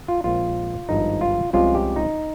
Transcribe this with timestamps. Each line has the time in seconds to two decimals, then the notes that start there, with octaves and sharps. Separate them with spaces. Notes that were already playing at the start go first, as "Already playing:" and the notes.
0.08 F4
0.24 A#1 A#2 G#3 C4 F4
0.89 G#1 G2 F3 D#4
1.21 F4
1.53 C2 C3 F3 G#3 C#4 F4
1.75 G4
1.96 D#4